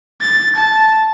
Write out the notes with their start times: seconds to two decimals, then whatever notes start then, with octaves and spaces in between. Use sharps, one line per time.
0.21 A6
0.55 A5